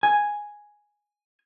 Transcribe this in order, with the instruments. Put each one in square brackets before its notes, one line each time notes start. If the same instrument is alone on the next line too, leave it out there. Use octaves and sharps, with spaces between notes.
[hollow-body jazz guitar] G#5